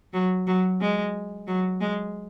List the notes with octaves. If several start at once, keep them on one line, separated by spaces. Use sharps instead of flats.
F#3
F#3
G#3
F#3
G#3